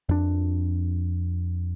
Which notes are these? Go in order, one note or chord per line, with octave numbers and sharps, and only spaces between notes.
F2 D4